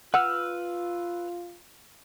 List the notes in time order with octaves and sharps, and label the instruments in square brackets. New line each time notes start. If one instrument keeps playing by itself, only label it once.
[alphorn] F4 [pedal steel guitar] B4 E6 F6 [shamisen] F#5